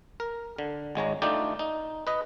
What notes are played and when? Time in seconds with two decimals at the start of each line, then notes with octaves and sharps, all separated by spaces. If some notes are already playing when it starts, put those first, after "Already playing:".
0.20 A#4
0.58 D3
0.95 G#1 G#3 C#5 A#5
1.22 A3 D4 D#4 F4 D5 G5
1.59 D#4
2.07 B4 D#5